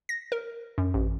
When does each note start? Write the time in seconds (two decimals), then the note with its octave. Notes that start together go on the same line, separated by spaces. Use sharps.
0.09 A#6
0.32 A#4
0.78 F#2
0.94 A1